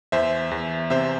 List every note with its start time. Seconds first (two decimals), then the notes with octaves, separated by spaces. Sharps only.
0.12 E2 C5 E5
0.51 E2
0.90 C3 C5 E5